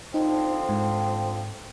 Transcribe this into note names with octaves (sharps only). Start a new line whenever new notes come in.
D3 F3 C4 D#4
G#2